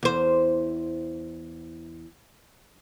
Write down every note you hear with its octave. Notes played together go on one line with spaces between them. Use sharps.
E2 C5